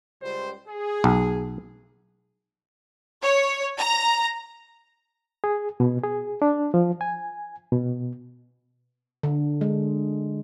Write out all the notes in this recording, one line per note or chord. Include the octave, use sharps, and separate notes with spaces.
C#2 G3 C5
G#4
B1
C#5
A#5
G#4
B2
G#4
D4
F3
G#5
B2
D3
G#3